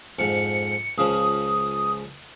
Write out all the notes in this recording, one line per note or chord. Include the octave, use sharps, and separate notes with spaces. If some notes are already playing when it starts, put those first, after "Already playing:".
F2 G#2 C#7
C#2 C#3 F3 D#6